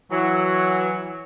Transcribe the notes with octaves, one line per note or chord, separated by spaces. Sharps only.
E3 F#3